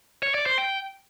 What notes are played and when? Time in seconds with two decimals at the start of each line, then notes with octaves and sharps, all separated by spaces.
0.23 C#5
0.34 D5
0.46 C5
0.58 G5